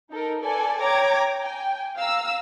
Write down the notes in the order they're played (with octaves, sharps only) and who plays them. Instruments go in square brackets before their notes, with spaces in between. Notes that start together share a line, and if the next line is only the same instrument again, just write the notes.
[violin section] D#4 A4 A#4
A4 B4 D5 G#5
C#5 G5 A#5 D6 G#6
G5 G#5
F5 A#5 E6